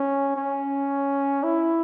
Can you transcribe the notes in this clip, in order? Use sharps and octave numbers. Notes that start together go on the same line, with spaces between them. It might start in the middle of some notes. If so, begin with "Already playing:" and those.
Already playing: C#4
C#4
E4